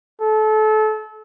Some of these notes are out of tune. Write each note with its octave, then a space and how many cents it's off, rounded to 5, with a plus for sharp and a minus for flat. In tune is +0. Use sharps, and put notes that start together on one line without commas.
A4 -30